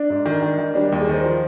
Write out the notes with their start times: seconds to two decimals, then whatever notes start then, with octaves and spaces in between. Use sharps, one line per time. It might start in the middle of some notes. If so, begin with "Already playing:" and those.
Already playing: D4
0.10 G#2
0.26 D#3
0.42 D#3
0.59 D#3
0.75 G3 D4
0.88 D#2 G4
1.01 G#4
1.09 D#3 C5
1.25 F3